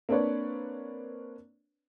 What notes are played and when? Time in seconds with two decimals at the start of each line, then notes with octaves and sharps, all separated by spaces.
0.09 A#3 C4 D4 B4 C#5 D5